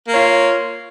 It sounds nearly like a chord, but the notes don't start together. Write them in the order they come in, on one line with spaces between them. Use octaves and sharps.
A#3 C#5 F4